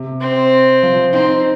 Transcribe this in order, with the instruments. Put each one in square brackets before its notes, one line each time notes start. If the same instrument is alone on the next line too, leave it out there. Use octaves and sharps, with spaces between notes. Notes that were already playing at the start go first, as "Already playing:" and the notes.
Already playing: [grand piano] C3
[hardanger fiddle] C4
[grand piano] F3
[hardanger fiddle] C4 [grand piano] D#4